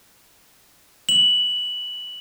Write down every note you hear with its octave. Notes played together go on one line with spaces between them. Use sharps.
F#7